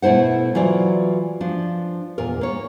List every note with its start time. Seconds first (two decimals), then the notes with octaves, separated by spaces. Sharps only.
0.02 B2 A3 E4 C5 F#5
0.55 E3 F#3 F4 D5
1.41 F3 D4
2.18 E2 A#2 A#4
2.41 A#3 C#5